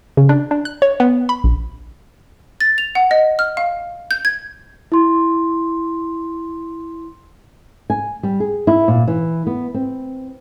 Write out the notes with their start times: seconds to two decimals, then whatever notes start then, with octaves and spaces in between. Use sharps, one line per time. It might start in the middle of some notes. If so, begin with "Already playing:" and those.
0.17 C#3
0.29 D4
0.51 D4
0.65 F#6
0.82 C#5
1.00 B3
1.29 B5
1.44 A#1
2.61 A6
2.78 F7
2.95 F#5
3.11 D#5
3.39 F6
3.57 F5
4.11 G6
4.25 G#6
4.92 E4 C6
7.90 G#5
8.23 G3
8.40 G#4
8.67 E4
8.88 A#2
9.08 E3
9.47 B3
9.74 C4